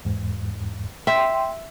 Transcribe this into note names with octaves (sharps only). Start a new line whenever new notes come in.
E2 G#2
E5 G5 C6